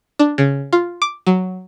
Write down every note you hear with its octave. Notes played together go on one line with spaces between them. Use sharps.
D4
C#3
F4
D6
F#3